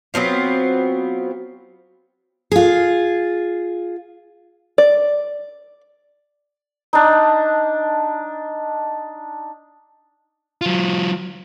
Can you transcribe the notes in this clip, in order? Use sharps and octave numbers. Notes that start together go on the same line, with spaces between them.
F#3 B3 C4 F4
F4 G#4
D5
D4 D#4
F#3 F4